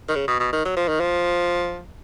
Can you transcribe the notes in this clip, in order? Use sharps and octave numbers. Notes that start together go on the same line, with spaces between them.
D#3
C#3
B2
B2
D#3
F#3
F3
D#3
F3